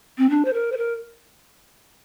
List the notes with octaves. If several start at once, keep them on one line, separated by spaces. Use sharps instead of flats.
C4
D4
C5
A#4
C5
A#4